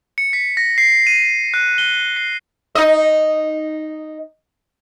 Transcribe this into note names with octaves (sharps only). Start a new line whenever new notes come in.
C#7
B6
A#6
C7
D#7
F#6
G7
C7
D#4 D#5